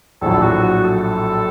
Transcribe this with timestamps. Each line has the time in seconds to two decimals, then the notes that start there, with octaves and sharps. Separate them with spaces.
0.22 A#1 A2 F#3 A4
0.42 F#4
0.64 F#4
0.85 A4